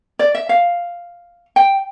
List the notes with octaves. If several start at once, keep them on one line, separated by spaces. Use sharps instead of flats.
D5
E5
F5
G5